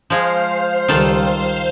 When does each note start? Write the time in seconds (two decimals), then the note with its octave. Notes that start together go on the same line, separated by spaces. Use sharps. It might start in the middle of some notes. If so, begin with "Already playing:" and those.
0.10 F3 G#3 C5 F5
0.88 C#2 D#3 G3 F4 A4